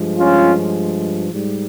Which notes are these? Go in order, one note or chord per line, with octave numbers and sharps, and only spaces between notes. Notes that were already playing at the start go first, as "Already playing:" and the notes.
Already playing: G2 F3 G#3
C#4 F4
G#2 G3